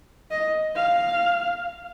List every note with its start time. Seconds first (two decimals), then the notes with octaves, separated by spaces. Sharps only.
0.31 D#5
0.76 F5